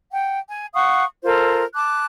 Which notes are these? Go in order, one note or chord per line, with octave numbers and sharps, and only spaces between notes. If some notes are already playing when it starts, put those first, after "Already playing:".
F#5 G5
G#5
F5 F#5 C#6 D#6
F4 A4 A#4 C5
A5 D6 F#6